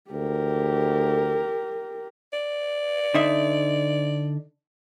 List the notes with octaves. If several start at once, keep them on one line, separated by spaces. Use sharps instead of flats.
D2 G4 A#4
D5
D3 D#4 E5